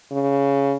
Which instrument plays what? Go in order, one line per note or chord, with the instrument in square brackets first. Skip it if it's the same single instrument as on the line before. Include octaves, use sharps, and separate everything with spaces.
[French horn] C#3